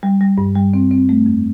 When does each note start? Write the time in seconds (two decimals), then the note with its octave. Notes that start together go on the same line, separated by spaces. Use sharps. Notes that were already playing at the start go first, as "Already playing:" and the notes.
0.03 G3
0.21 G3
0.38 G2
0.55 G3
0.74 C4
0.91 C4
1.09 A3
1.26 F2